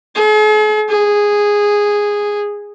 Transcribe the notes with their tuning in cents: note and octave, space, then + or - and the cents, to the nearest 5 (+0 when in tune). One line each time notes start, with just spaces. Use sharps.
G#4 +45
G#4 -10